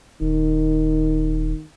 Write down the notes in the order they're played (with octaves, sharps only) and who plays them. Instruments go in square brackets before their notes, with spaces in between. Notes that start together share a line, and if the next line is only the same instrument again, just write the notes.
[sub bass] D#1 [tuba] D#3